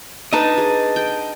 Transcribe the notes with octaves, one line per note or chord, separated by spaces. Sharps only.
D4 D#4 B4 D#5 A5
G#4
G5